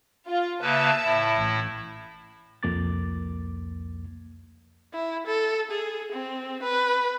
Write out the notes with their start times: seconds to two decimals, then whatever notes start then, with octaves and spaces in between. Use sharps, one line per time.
0.28 F4
0.62 C#3 A#3 B4 E5 A5
1.05 A2 E4
1.36 A1
2.63 C2 F2 A#3 D6 A6
4.94 E4
5.26 A4
5.71 G#4
6.12 C4
6.63 B4